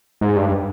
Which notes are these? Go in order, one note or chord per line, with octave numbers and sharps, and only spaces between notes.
G#2
G2